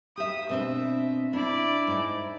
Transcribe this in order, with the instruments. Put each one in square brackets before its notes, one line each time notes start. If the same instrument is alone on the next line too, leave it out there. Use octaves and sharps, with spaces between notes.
[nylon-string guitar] G4 E5 [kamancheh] D#6
[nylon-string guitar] B2 C4 D4 [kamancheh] E5
[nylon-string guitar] D4 [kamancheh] E4 D5
[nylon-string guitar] G#2 D#4